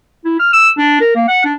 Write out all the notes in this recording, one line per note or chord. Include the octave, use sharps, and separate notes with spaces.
E4
F6
E6
D4
A#4
A#3
F#5
D4